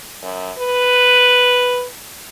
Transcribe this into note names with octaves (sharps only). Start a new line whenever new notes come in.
F#2
B4